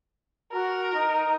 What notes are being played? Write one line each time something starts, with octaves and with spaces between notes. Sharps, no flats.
F#4 A#4
D#4